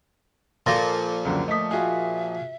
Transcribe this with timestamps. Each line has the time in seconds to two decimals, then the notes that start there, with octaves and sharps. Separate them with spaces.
0.66 A#2 F3 A4 C6 A6 A#6
1.25 C#2 F#2 D3
1.48 A3 D#5 D#6 B6
1.71 F4 F#4 G#4 E5